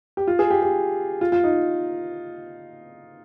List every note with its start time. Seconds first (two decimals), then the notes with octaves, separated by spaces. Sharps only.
0.17 G4
0.28 F4
0.39 G#4
0.50 G4
0.62 G4
1.21 F4
1.32 F4
1.44 D#4